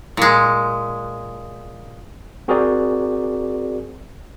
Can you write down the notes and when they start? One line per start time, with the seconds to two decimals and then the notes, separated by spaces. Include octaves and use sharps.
0.17 A#2 G#3
2.48 C4 F#4 G#4 A#4 C5 D5